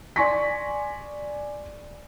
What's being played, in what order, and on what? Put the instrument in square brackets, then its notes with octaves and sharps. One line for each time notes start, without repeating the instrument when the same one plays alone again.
[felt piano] D5 G#5 C6 C#6 A#6 B6